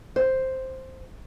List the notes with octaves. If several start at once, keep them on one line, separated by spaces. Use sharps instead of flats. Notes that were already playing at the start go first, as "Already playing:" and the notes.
C5